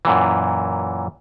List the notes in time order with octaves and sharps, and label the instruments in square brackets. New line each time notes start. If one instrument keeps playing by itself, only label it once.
[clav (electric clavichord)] F#2 A#2 E3